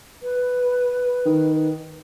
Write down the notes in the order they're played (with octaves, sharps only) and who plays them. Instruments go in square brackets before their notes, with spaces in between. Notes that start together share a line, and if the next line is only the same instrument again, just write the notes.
[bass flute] B4
[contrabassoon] D#3